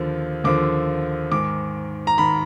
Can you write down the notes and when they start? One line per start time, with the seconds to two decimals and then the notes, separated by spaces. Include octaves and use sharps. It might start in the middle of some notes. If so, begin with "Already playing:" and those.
Already playing: D#2 D3 F3
0.44 D#2 D3 F3 D6
1.32 G#2 D#3 D6
2.07 A#5
2.18 D#3 B5